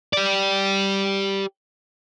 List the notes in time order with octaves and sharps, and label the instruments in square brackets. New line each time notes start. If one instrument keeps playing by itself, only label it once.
[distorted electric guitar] G4 D5